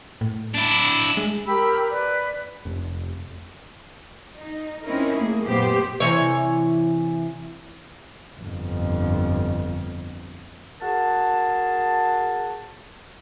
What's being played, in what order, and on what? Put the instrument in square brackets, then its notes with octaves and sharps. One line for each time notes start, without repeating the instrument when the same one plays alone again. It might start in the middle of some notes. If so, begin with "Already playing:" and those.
[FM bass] A2
[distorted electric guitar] D4 E4
[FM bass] G#3
[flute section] G4 A#4 B5 E6
B4 D5
[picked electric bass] F1
[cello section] D#4
C4 C#4 D#4 E4 A#4
A3 A#3 G#4
F#2 A#2 B3 G4 C5
[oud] C3 E3 C#5
[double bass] G1 F2
[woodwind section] F#4 G#4 A#4 A5